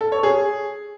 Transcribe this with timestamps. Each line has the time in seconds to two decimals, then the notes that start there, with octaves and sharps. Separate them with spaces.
0.01 A4
0.12 C#5
0.23 G#4